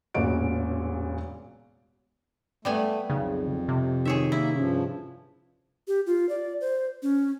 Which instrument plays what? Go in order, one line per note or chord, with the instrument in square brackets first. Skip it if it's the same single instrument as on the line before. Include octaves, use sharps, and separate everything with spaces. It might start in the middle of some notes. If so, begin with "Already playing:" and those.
[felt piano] E1 A1 A#2 C#3 F#4 D7
[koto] G3 B3 G#5 [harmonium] A3
[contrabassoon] B1 [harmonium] F2 [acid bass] C#3
[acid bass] C3
[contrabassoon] D#3 [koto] G#4 C#5 E5
[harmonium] A#3 E5 [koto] E4
[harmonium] G2 F3 [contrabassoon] C#3
[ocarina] G4
F4
D5
C5
C#4